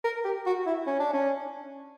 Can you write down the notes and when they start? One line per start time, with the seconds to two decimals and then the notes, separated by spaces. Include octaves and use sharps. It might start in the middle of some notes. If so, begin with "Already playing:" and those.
0.04 A#4
0.25 G4
0.46 F#4
0.67 E4
0.87 C#4
1.00 D4
1.13 C#4